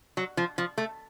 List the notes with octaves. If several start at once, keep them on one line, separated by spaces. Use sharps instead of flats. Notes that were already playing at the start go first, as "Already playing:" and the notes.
F#3
F3
F3
A3